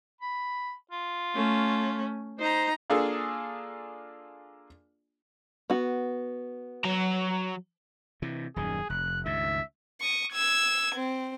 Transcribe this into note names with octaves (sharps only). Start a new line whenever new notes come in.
B5
F4
A3 C#4
D#4 C5 A#5
A#3 D4 F4 G#4 A4
B3 F#4
F#3 A#5
C3 E3
D#1 F#2 D#3 G#4
F1 F#6
C#2 G2 D#3 E5
C#6 D#6
E6 G#6
C4